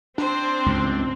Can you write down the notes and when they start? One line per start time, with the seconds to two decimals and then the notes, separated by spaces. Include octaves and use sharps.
0.18 C4 D4 C5
0.66 C#2 G2